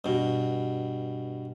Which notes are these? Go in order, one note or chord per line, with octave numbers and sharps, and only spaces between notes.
G2 B2